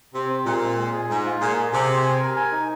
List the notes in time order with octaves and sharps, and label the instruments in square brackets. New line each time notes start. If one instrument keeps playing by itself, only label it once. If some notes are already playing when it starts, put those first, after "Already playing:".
[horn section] C3 [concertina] C4
[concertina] C4
[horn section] A#2 [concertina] G#3
[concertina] C4
G#3
G#4
[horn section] G#2 [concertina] G#3
[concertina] F4
[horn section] A#2 [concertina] G#4
[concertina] G#4
[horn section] C3 [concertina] G#4
[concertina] C4
G#5
A#4
G#5
D#4